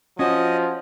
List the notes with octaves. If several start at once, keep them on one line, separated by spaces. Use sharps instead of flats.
F3 C#4 F#4 D#5